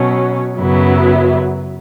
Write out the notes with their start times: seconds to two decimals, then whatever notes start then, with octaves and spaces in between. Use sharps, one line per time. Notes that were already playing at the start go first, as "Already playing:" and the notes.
Already playing: B2 F#3 C#4
0.57 F#2 C#3 F#3 B3 E4